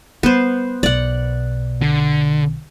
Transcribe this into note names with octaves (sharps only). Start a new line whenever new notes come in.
G3 B3 C5
B1 B2 D5 F#5
D3